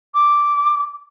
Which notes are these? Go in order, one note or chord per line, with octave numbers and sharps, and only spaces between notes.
D6